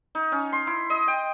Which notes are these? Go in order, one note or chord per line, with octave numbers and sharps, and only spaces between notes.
D#4
C#4
C6
E4
D#5
G5